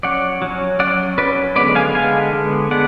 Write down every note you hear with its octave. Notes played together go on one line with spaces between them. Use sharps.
F#3 C#4 D5 F#5
F#3 C#4
F#3 C#4 D5 F#5
F#3 C#4 B4 D5
D3 G#3 B3 B4 D5
F5 G#5
D3 G#3 B3 F5 G#5
D3 G#3 B3
D3 G#3 B3 D5 F#5